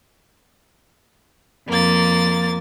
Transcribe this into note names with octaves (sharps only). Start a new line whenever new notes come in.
F2 A#3 A6